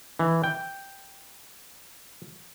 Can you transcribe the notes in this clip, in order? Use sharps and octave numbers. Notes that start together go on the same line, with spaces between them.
E3
G5